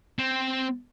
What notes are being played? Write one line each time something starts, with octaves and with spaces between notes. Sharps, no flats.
C4